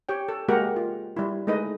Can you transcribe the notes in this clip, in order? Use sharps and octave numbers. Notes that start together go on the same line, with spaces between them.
G4 C#5 G5
A4
G#3 A#3 F#4 G4 A#4 F#5
F4
G3 E4
G#3 A3 D#4 B4 D#5